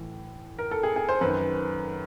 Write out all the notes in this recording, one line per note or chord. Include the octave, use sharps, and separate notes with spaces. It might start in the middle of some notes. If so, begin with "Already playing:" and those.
Already playing: A2 E3
A#4
A4
G#4
G#4
C5
F#2 D#3 B4